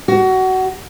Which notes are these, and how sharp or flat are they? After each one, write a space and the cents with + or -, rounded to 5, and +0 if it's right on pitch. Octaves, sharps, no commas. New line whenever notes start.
F#4 +20